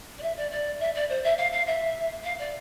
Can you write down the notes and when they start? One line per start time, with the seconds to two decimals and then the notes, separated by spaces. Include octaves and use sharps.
0.18 D5
0.23 E5
0.37 D5
0.51 D5
0.80 E5
0.95 D5
1.09 C5
1.24 E5
1.38 F5
1.52 F5
1.67 E5
2.24 F5
2.39 D5